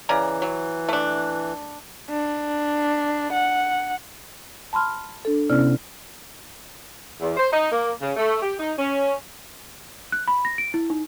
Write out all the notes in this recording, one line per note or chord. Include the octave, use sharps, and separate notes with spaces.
C#3 E3 D5 A#5
F#3
A3 D4
D4
F#5
A5 B5 C6 F6
D4 A4
C3 B3 C#4 E4 D5 F6
E2
C5
D#4
A#3
C#3
A3
G4
D#4
C#4
F#6
B5
A#6
D7
E4
D#4